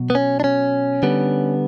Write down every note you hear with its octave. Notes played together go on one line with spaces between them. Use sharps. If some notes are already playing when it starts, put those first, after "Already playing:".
Already playing: B2 F#3
B3
C#4
D4
C#4
D3 G3 B3